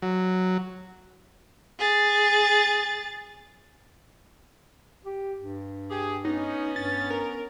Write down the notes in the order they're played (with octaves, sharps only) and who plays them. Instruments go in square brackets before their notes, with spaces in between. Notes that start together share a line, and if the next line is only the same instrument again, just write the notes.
[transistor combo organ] F#3
[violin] G#4 A6
[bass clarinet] G4
G2
[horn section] G4 G#4
[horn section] B3 C#4 [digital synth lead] D#4
[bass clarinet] G2 [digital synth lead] A6
[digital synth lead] A#4